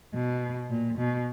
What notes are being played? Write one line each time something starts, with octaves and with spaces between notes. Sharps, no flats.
B2
A#2
B2